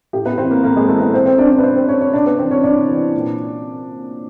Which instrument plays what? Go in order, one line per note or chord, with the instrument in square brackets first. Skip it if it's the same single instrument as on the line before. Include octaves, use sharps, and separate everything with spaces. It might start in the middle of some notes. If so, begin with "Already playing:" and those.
[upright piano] A2 G4
B3 B4
E3 C4 C5
A#3 A#4
A2 A#3 A#4
G#3 G#4
E3 A3 A4
B3 B4
B2 C4 C5
C4 C5
D4 D5
D4 D5
B4
B2 C4 C5
C4 C5
C#4 C#5
C#4 C#5
C3 D4 D5
B3 B4
E3 C4 C5
C#4 C#5
C3 D4 D5
E3
A#2